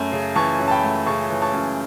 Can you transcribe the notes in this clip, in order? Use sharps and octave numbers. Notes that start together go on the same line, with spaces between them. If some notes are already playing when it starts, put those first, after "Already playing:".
Already playing: F#2 A3
C#3
E3 A5 C#6
F#2
A5
G5 B5
A3
C#3 A5 C#6
E3
A5 C#6
F#2